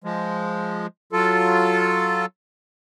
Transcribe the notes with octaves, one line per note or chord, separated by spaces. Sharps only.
F3 G#3
F#3 F4 A4